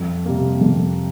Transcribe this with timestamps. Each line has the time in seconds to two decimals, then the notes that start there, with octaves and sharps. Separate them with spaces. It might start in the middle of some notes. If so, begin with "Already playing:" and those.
Already playing: F2
0.26 C3 G3 A#3
0.61 F2